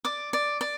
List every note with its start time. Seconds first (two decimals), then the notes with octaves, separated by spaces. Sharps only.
0.05 D5 D6
0.33 D5
0.61 D5